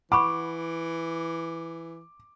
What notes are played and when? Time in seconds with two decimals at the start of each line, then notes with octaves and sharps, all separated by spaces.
0.12 E3 F#5 B5 C#6 D6